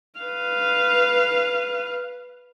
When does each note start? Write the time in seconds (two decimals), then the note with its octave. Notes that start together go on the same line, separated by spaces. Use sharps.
0.20 B4 F5